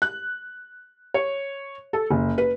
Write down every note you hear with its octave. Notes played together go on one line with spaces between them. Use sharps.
F#6
C#5
A4
F#1
B4